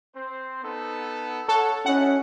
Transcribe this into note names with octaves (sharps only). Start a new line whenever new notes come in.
C4 C5
B3 D#4 A4
A4 C#5 F#5 A5
C#4 E4 F#4 D#5 F#5